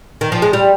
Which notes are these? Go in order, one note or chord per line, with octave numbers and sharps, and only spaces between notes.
D#3
F3
G#3
G3